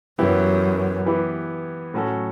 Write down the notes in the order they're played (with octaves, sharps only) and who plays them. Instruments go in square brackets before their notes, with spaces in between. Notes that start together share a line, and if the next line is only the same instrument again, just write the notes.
[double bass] F#2 [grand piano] E3 B3 E4 G4
[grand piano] E3 B3 E4 G4
A2 F#3 C#4 F#4 A4